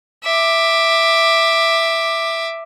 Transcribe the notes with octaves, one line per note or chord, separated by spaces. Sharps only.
E5 D6